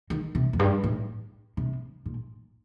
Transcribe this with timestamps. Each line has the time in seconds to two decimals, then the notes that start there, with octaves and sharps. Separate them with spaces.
0.10 D#3
0.35 C3
0.53 F2
0.59 G2
0.84 A2
1.57 C3
2.06 A#2